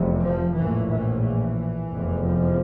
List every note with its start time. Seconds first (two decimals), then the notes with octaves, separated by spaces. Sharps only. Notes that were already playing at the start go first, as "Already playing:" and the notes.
Already playing: F1 E2 C3
0.23 F3
0.56 A#1 A2 E3
0.90 E3
1.23 E3
1.91 F1 E2 C3
2.24 F3